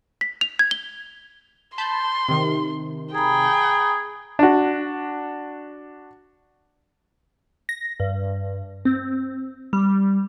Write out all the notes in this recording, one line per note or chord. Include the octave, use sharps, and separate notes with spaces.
B6
F7
G#6
G7
A5 B5 C6 G6
C3 D#3
G#4 G5 A#5 B5
D4 F#4
A#6
G2
C4
G3